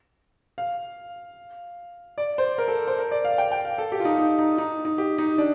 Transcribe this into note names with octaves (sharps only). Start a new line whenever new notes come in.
F5
D5
C5
A#4
A4
C5
A#4
D5
F5
G5
G5
F5
A4
G4
F4
D#4
D#4
D#4
D#4
D#4
G4
D#4
D4